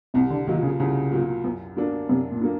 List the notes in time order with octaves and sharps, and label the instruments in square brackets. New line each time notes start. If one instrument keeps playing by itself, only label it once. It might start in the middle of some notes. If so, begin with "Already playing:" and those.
[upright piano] C2 [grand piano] C3
[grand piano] D3
[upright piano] A#2 F#3 [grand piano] D#3
[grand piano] C#3
[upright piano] C2 [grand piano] C#3
[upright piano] A#2 F#3
F#2
D3 F#3 A#3 D4
[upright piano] F#2 [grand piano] C3
[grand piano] A#2
[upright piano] D3 F#3 A#3